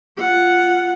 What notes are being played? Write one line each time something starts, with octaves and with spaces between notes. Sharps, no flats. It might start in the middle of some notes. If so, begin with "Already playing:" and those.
F4 F#5